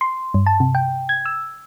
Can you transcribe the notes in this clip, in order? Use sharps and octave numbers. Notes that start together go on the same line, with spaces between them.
C6
G2
A5
C3
G5
G#6
E6